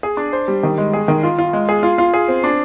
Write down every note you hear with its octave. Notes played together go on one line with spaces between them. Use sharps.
G#4
D4
C5
G3
D#3
G#3
G#4
D#3
F4
F4
G#3
G#4
F4
F4
G#4
C4
D4